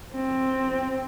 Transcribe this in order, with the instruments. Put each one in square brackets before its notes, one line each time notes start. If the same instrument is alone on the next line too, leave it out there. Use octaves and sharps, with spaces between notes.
[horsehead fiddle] C4